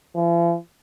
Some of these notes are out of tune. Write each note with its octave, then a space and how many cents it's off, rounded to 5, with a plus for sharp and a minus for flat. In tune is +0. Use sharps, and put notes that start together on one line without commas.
F3 -45